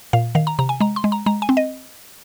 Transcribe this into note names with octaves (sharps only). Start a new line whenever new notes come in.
A#2 F5
D#3 F5
A#5
C3 A#5
G#5
G#3 A#5
C6
G#3
A#5
G#3 A#5
G#5
C4
D#5